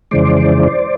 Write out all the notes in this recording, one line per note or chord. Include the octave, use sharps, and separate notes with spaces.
F2 C#3 E3 G#3 C5 D5